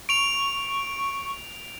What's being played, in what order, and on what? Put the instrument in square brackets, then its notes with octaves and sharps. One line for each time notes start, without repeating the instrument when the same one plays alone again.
[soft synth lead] C#6 [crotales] D7 F7